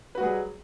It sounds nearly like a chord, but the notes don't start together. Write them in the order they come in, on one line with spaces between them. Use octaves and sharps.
B4 F#4 G3 G#4 F#3